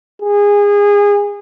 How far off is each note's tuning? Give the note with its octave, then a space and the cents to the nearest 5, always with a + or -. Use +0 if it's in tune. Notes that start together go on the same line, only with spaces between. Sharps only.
G#4 -25